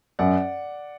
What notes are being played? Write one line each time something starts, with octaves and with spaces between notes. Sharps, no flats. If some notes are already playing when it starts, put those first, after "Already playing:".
F#2 D5 F#5